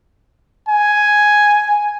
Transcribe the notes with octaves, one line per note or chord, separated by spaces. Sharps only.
G#5